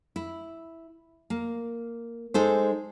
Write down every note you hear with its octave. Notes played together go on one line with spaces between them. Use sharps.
E4
A#3
G#3 D#4 A4 C5